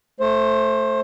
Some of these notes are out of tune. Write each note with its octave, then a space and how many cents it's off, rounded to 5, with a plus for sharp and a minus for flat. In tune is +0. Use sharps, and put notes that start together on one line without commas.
A3 +0 C5 +20